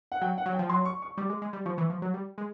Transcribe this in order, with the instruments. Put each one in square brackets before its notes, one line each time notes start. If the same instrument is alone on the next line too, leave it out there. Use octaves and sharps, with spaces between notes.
[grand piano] F#5
[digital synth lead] F#3 [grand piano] G5
[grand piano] F#5
[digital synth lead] F#3
[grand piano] G5
[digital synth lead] F3
[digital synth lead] F#3 [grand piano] C6
[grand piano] C#6
C#6
[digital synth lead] G3 [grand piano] D6
[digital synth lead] G#3
G#3
G3
[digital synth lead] F3 [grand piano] C#6
[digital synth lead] E3
F3
F#3
G3
G#3